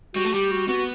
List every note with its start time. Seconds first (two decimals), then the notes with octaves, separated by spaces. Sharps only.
0.15 G3 F#4
0.25 A3
0.33 G3 G4
0.51 F#4
0.68 B3 F#4